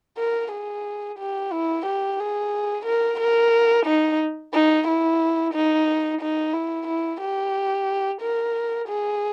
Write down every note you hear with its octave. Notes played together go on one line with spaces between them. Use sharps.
A#4
G#4
G4
E4
G4
G#4
A#4
A#4
D#4
D#4
E4
D#4
D#4
E4
E4
G4
A#4
G#4